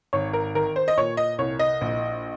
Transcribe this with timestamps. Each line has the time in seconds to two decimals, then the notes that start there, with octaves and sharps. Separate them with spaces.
0.13 G#1 C#5
0.33 A#4
0.55 D#3 A#4
0.76 C5
0.88 D#5
0.97 A#2 C#5
1.17 D#5
1.38 C2 C#5
1.59 D#5
1.81 A#1